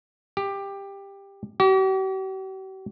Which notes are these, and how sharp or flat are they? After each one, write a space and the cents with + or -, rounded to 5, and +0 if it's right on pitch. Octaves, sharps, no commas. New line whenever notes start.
G4 +15
G4 -45